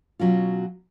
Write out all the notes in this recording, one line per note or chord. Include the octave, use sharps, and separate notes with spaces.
B2 F#3 C#4 F4